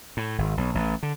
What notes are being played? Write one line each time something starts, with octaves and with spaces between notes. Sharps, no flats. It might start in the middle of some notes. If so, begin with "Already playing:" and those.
A2
G#1
B1
A1
D3